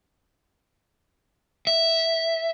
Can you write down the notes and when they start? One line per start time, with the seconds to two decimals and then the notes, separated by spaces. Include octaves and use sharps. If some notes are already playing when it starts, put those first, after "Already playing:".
1.67 E5